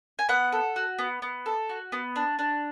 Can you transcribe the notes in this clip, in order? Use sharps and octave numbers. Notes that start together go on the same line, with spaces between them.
G#5
B3 F#5
A4
F#4
B3
B3
A4
F#4
B3
D4
D4